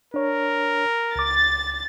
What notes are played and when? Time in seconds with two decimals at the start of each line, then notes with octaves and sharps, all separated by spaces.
0.14 D4 A#4 C#5
1.16 C#2 D6 A6